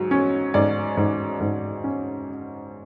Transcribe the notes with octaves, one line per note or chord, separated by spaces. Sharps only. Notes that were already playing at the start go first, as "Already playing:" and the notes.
Already playing: G#2 F#3
C#4
G#2 D5
G#2
G#2
C#4